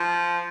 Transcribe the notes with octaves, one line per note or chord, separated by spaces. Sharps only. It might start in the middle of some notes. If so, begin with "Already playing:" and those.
Already playing: F3